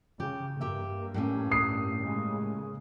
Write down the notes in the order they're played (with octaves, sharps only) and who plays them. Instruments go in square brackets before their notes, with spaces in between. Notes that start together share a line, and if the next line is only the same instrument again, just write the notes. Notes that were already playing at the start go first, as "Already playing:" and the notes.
[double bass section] C#3 [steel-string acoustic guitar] G4
[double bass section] G2 A#3 [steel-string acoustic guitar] G4 E5
[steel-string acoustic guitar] A2 G3 C#4
[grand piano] D#6 C7
[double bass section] C#3 G#3 A#3